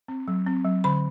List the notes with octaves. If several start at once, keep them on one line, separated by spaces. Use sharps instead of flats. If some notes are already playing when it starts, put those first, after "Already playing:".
C4
F#3
C4
F#3
D3 B5